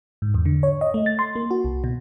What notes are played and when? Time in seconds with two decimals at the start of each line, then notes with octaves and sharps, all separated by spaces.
0.22 G#2
0.34 E2
0.46 D3
0.63 C#5
0.81 D#5
0.94 A3
1.06 A6
1.19 C6
1.35 A#3
1.51 F#4
1.64 C2
1.84 B2